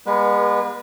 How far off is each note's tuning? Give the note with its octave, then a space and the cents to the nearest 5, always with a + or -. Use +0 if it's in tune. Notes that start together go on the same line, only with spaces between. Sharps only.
G#3 -40 B3 -45 B4 -25